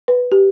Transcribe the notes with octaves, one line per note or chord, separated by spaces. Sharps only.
B4
G4